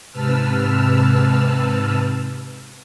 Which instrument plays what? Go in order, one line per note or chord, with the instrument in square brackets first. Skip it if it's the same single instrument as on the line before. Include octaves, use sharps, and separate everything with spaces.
[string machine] G#2 C3 B4 A5 E6 F6